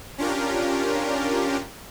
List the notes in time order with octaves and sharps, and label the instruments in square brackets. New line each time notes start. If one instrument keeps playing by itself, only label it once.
[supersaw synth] C#4 D4 F4 G4 A#4